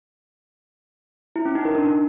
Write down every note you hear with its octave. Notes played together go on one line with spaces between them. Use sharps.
E4
C#4
D#4
A#4
D4